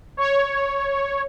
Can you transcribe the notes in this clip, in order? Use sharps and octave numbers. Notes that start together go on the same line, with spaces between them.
C#5